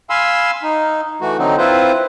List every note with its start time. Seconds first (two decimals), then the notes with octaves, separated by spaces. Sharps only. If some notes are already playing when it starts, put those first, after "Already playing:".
0.10 F5 G#5 B5 C6 E6
0.63 D#4
1.21 E3 A3 F#4
1.39 D3 F#3 C4 D#4
1.58 C4 E4 F4 B4 C5